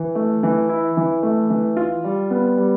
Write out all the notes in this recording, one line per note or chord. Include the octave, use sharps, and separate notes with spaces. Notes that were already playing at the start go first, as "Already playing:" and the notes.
Already playing: E3
A3
E3
E4
E3
A3
E3
F4
G3
B3
G3